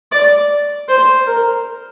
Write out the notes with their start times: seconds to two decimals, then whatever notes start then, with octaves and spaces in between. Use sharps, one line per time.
0.12 D5
0.89 C5
1.27 A#4